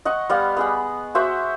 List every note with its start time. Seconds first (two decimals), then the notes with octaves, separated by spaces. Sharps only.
0.05 D#5 F#5 C#6
0.29 G3 B3 F5
0.57 B3 G#4 F#5
1.15 F#4 C5 E5 F#5